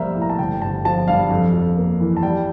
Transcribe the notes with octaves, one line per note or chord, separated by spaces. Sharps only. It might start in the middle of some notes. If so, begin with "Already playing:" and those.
Already playing: A#1 G3 A#3 A#4 C5 E5
A2
A#5
A5
G1 G5
G1 A5
F3 A5
G2 F5
F2
F2
A#3
E3
A5
G3 G5